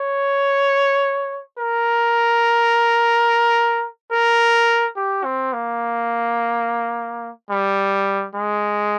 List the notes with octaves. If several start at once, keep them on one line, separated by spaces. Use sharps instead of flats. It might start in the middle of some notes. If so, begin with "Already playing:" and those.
Already playing: C#5
A#4
A#4
G4
C4
A#3
G3
G#3